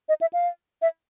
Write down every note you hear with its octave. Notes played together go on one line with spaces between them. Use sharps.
D#5
E5
F5
E5